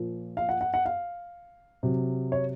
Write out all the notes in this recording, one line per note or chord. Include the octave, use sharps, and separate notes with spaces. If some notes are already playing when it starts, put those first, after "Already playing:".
Already playing: A#2 F3
F5
F#5
F#5
F#5
F5
C3 F#3
C#5